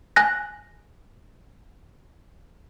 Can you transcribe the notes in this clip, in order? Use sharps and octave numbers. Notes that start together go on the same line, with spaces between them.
G#5 F#6 A#6